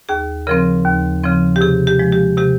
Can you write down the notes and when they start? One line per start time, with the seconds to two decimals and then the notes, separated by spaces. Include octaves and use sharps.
0.09 D#2 G#4
0.47 C#3 F3 C4 A#4
0.86 D#2
1.23 C#3 F3 C4
1.56 G4
1.61 C3 G#4
1.87 G4
1.99 F3 G#3
2.12 G4
2.37 C3 G4